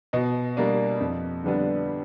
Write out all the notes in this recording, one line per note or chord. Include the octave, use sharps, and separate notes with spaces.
B2 D#5
G3 A#3 D4
F2
D3 G3 B3 D4